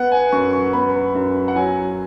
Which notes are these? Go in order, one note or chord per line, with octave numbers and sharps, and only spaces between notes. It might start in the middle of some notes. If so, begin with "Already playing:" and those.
Already playing: B3 F#5
G#5
F#2 C#6
C#6
B3 B5
F#2
F#5
F#3 G#5